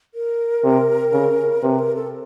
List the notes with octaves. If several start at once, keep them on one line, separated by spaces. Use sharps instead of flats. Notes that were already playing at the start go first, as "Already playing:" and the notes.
A#4
C3
C#3
C3 B4
A#4
A4